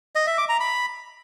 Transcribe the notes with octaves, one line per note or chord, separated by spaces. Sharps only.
D#5
E5
D6
A#5
B5